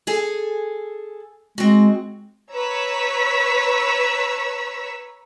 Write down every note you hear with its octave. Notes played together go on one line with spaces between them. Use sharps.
G#4 A4 G#5
G#3 C4 F#4
B4 C#5 A#5 C#6 E6 B6